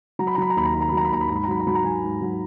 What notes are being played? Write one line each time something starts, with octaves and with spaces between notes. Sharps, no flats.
F#3 A#5
B5
A#5
F#3 B5
A#5
D#2 B5
A#5
D#3 B5
A#5
B5
F#3
A#5
B5
D#2 A#5
B5
G#2 A#5
B5
A#5
F#3 B5
A#5
F#3 B5
A#5
F#3 G#5
G#2
F#3